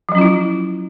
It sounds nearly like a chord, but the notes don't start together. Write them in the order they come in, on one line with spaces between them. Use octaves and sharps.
F3 F#3 C#4 F4 E4